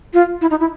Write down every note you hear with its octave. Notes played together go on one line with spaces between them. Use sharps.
F4
E4
D#4
E4